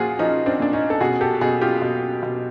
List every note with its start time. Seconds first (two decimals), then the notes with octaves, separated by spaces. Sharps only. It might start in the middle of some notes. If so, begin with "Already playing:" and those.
Already playing: A#2 F3 F4 F#4 G#4
0.19 F3 C#4 D#4
0.46 C4 D4
0.60 A#2 D4
0.73 C#4 D#4
0.90 A4
1.00 B2 F#4 G#4
1.21 G4 A4
1.41 B2 F#4 G#4
1.61 F4 G4
1.82 B2
2.23 B2